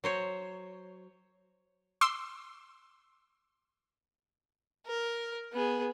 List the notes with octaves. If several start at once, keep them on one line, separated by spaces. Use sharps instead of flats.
F#3 C5 C#5
C6 D6 E6
A#4
B3 G#4